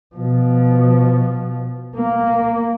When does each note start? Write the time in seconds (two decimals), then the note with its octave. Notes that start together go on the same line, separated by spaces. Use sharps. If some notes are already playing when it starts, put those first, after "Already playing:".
0.15 B2 F3
1.96 A#3